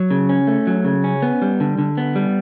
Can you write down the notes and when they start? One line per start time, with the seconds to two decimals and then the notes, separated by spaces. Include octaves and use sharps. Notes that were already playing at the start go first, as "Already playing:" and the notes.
Already playing: F#3
0.11 C#3
0.29 C#4
0.47 A3
0.67 F#3
0.85 C#3
1.04 C#4
1.22 B3
1.42 G3
1.60 D3
1.79 D3
1.98 B3
2.15 G3